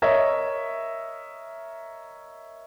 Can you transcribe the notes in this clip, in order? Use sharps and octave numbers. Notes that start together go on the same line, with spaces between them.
A#4 C#5 D#5 E5